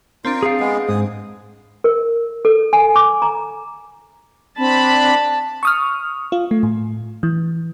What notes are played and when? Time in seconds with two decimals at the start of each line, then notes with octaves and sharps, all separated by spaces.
0.25 C4 D4 F4 A#4
0.43 G#4 F5
0.60 G#3 B3
0.89 G#2 G#4 D#6
1.84 A#4
2.45 A4
2.73 G#5
2.96 D6
3.22 A#5
4.58 C4 D4 A5 B5
5.63 C#6 D#6 F6
6.32 F4
6.51 A3
6.63 A2
7.23 E3